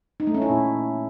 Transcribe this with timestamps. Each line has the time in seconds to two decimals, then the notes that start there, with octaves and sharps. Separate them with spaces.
0.20 D#4
0.27 A3
0.34 C#4
0.42 E4
0.49 A#2